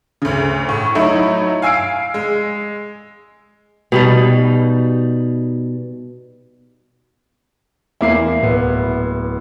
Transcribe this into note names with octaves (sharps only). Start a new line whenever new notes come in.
D2 C#3
A2
F#3 A3 D#4 E4
F5 G#5 E6 C7 D7
G#3
B2 G3 D#4
E2 A#3 E4 D6 C7
D1 B3